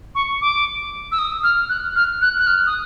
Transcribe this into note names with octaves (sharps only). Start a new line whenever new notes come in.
C#6
D6
E6
D#6
F6
F#6
F6
F#6
F#6
F6
D#6